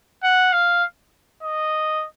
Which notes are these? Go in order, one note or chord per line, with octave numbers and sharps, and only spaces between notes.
F#5
F5
D#5